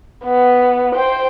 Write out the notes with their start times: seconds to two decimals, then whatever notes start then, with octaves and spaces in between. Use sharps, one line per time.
0.25 B3
0.95 C5 G5